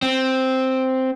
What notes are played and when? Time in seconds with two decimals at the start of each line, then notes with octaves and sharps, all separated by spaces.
0.02 C4